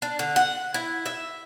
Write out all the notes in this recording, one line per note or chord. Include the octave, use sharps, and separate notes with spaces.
D4
D3
F#5
E4
E5